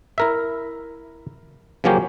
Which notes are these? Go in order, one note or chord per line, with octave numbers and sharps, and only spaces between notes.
E4 A#4 E5
C#3 F3 F#3 A#3 C#4 G4